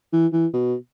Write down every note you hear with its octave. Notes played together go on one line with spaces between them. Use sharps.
E3
E3
B2